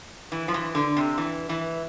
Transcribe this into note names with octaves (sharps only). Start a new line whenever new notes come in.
E3
F3
E3
D3
C3
E3
E3